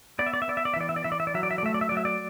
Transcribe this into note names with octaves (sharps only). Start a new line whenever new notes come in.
B3 D5
E5
D5
E5
B3 D5
E5
D5
E5
E3 D5
E5
D5
E3 E5
D5
E5
D5
F#3 E5
D5
E5
D5
A3 E5
D5
E5
D5
F#3
E5
D5